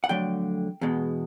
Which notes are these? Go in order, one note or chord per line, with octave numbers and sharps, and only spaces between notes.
F#5
F2 D3 F#3 A3 G5
E2 B2 G#3